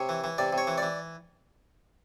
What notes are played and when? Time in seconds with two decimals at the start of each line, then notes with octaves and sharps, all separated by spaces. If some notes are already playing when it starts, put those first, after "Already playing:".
Already playing: C3 C#5
0.09 E3
0.24 E3
0.38 C3 D5
0.53 C3
0.58 C#5
0.67 E3
0.78 E3 D5